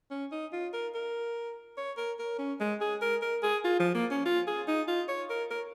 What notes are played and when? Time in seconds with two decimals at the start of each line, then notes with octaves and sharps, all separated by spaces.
0.11 C#4
0.32 D#4
0.53 F4
0.73 A#4
0.95 A#4
1.77 C#5
1.97 A#4
2.19 A#4
2.39 C#4
2.60 G#3
2.81 G#4
3.01 A#4
3.22 A#4
3.43 G#4
3.64 F4
3.79 F3
3.95 A#3
4.11 C#4
4.26 F4
4.47 G#4
4.68 D#4
4.88 F4
5.08 C#5
5.30 A#4
5.50 A#4